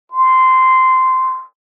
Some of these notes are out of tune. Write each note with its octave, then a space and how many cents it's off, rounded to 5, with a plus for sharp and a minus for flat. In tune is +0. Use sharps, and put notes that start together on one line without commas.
C6 -10